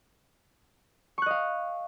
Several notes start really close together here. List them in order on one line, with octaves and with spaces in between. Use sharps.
C#6 F#6 D#5 F5